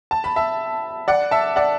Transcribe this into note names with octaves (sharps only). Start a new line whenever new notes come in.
A5
B5
E5 A5
D5 F#5
E5 A5
D5 F#5